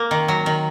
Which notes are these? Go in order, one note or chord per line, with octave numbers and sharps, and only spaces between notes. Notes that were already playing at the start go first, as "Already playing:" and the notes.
Already playing: A#3 A#4
D#3
F#3
D#3